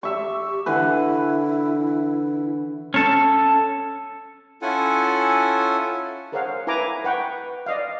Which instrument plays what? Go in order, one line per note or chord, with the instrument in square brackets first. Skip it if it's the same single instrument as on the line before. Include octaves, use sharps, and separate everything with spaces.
[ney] G4 [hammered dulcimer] E5 C#6
[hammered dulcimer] D3 E3 B4 [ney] E4
[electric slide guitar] C#4 A4
[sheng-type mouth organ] C#4 E4 F4 A4 F#5 G#5
[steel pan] G#4 A#4 C5 C#5 F5 F#5
E4 B4 G#5 A#5 D6
B4 F#5 G5 C#6
D5 D#5 F5